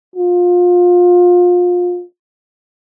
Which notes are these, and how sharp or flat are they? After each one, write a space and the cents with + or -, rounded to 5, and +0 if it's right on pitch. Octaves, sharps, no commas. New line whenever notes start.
F4 +25